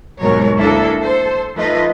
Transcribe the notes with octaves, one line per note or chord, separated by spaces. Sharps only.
D#2 G#2 B2 F#3 A#4 C#5
D2 A#3 D4 E4 A4
A4 C5
F3 A3 D#4 F4 B4 D#5